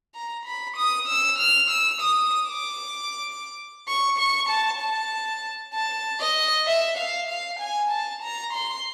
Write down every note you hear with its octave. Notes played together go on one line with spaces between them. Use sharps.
A#5
B5
D#6
E6
F6
E6
D#6
D6
C#6
C#6
A5
A5
A5
D#5
E5
F5
F5
G#5
A5
A#5
C6